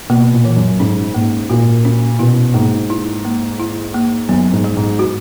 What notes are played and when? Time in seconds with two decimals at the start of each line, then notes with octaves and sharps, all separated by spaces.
0.09 B2 A#3
0.33 A#2
0.45 E3
0.57 F#2
0.80 G#2 C#4
1.14 G#2 A#3
1.50 A#2 F#4
1.85 C#4
2.19 B2 E4
2.54 G#2 A#3
2.90 E4
3.25 A#3
3.60 E4
3.94 A#3
4.29 F#2 B3
4.52 G#2
4.64 F#3
4.77 G#2
4.99 F#4